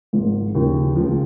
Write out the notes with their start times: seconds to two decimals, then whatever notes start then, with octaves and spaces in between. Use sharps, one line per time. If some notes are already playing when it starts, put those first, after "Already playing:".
0.13 G#1 G#2 F3
0.55 D#2 C#3 F3
0.96 C#2 C#3 F3